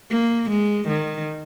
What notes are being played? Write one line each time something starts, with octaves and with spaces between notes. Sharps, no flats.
A#3
G#3
D#3